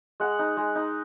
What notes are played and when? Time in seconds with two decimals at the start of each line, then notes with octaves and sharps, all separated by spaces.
0.20 G#3 F#5
0.39 D#4
0.57 G#3
0.75 D#4